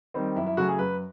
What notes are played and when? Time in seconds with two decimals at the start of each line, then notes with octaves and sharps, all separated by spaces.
0.14 D#3 G3 C4
0.35 F#2 E4
0.46 E4
0.57 C#3 F#3 A3 C#4 F#4
0.68 G#4
0.79 F#2 B4